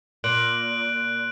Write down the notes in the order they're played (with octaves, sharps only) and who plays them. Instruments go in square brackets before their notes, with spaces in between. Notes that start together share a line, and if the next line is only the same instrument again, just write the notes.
[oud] A#2 [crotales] F#6 D7 F#7